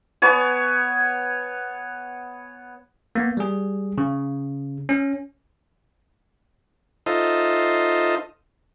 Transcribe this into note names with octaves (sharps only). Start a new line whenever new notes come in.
B3 C#5 G#5
A#3 B3
G3 G#4
C#3
C#4
D#4 F4 A4 C5 D#5 E5